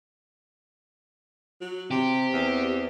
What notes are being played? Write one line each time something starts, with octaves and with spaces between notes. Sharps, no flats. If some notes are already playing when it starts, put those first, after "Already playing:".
F#3
C3 C4 G4
E2